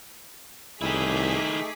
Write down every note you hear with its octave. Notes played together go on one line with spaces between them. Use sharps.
C2 D#3 A3 D#4 E4 G#4 D6 B6